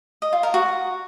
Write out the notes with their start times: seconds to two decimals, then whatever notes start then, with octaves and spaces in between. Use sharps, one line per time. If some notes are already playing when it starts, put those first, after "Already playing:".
0.22 D#5
0.33 F4
0.43 A#4
0.54 F#4